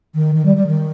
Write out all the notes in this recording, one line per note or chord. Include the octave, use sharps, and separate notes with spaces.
D#3
D#3
G3
G3
D#3